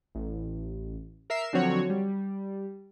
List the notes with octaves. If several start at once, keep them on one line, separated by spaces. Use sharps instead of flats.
A1
A#4 E5 C7 E7
D3 F3 F#3 C4 F#4 C#5
G3